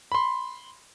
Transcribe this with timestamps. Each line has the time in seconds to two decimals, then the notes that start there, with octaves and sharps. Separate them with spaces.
0.12 B5 C6